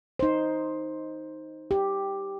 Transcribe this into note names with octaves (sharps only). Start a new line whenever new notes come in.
D#4 C5
G4